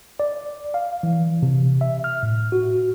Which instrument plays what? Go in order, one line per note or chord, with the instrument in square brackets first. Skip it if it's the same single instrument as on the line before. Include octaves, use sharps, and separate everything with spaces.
[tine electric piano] D5
F5
E3
C3
E5
F6
A2
F#4